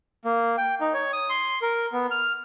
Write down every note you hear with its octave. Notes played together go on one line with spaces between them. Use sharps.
A#3
G5
D#4
C#5
D#6
C6
A#4
B3
F6